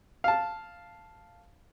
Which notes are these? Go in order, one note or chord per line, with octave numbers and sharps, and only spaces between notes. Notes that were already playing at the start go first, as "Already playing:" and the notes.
F5 A5